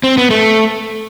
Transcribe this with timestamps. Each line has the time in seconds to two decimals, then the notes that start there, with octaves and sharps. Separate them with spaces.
0.04 C4
0.18 B3
0.31 A3